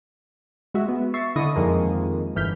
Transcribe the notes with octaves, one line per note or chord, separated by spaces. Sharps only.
G#3 F#4 E5
B3
E5 C#6 A6 C7
D3 E4 D#5 C#6 D#6
F2 D#3 F3 G#3 A#3
G1 E3 F6 G6 B6